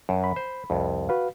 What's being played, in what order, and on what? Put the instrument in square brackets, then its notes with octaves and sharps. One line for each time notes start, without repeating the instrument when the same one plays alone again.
[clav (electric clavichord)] F#2
[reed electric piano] B5
[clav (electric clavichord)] C5
C2 F2
[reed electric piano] F#4 B4 F5